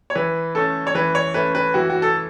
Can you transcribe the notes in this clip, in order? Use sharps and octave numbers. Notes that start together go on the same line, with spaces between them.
C#5
E3 B4
A3 C#4 A4
C#5
E3 B4
C#5
A3 C#4 B4
B4
E3 F#4
F#4
A4